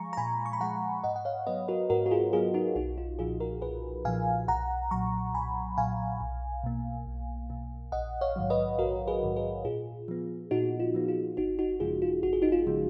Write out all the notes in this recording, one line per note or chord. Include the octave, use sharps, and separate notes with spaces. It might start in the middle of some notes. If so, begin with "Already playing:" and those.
Already playing: F3 G#3 F5 G#5 A#5 C#6
A#5
A#2 G#5 B5
C#6
B5
F3 G#3 F#5 A#5
G#2 D#5 F#5
F#5
C#5 F5
F#3 B3 B4 D#5
F#4 A#4
G#2 F#4 A#4
F#4
F4 G#4
F#3 B3 F4 G#4
D#4 F#4
B1 D#4 F#4
F4
A#2 F3 F4 G#4
F#4 A#4
B1 G#4 B4
A#2 F3 F5 G#5
B1 F#5 A#5
A#2 F#3 A#5 C#6
B1 G#5 B5
A#2 F#3 F5 G#5
B1
B2 A#3
B1
B2 A#3
A#1 D#5 F#5
C#5 F5
G#2 D#3 F#3
B4 D#5
A#1 F#4 A#4
G#4 B4
G#2 D#3 F#3
G#4 B4
A#2 F4 G#4
F3 B3
A#2 D#4 F#4
F4
F3 B3
F4
G#1 D#4 F#4
D#4 F#4
F#2 C#3 F3 G#3 F4 G#4
F4
G#1 F#4
G#4
D#4 F#4
F4
C#3 F3 G#3